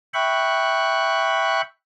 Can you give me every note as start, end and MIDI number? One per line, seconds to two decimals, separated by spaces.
0.14 1.61 76
0.14 1.61 79
0.14 1.61 83
0.14 1.61 85
0.14 1.61 90